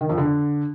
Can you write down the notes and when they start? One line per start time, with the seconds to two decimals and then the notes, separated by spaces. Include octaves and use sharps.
0.01 D#3
0.09 F2
0.18 D3